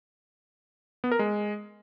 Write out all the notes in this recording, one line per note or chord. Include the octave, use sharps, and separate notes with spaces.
B3
A#4
G#3